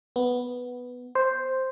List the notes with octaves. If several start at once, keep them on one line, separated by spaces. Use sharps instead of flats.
B3
C5